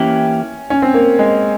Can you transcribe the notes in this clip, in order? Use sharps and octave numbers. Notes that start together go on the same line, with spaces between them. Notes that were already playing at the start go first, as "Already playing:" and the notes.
Already playing: E3 A#3 C#4 E4 G4
C#4
C4
A#3
G#3